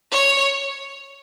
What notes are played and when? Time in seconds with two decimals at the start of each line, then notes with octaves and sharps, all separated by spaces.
0.11 C#5